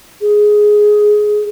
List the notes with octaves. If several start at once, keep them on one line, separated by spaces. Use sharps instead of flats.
G#4